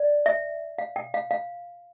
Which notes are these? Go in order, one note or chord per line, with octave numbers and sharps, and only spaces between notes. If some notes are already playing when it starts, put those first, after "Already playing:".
Already playing: D5
E5
F5
G5
F5
F5